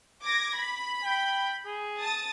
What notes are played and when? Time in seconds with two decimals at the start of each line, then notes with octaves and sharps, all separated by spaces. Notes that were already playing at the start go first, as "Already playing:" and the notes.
0.23 D6 G#6 A#6
0.55 B5
1.04 G5
1.66 G#4
1.99 A5 D#6 A6